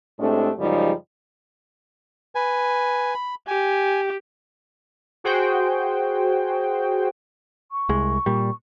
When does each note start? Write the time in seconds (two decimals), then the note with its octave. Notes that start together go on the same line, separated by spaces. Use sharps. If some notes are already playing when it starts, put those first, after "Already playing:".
0.19 A2 G#3 A3 C4 D4 G4
0.58 F#2 C#3 F3 G3 G#3 D#4
2.35 B4 G#5
3.14 B5
3.48 G4 G#5
5.24 F#4 G#4 C5 G5
7.72 C#6
7.89 C2 G#3
8.26 A#2 G3